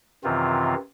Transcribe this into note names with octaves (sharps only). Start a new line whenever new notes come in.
F#2 C3 D#3 E3 C4 F4